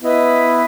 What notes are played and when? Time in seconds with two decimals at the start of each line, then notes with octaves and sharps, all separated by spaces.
0.02 B3 E4 B4 D#5